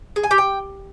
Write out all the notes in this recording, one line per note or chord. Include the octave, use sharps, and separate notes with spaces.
G#4
G#5
G4
G5